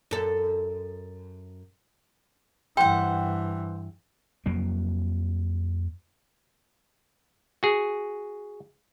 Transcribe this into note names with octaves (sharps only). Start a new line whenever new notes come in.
F#2 A4
G2 E3 C5 F#5 G5
F2 F#3 A#3
F#4 G#4